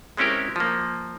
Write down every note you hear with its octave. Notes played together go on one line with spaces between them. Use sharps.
G#3 C4 C#4 E4 G4 A#4
F3 A#3